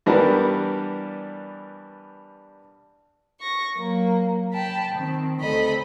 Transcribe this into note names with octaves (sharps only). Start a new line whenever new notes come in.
G2 E3 G3 B3 D4 A#4
C#6 A#6
F#3 A#3
G5 A5 B5
D#3 C4
D2 C4 A4 D#5 B5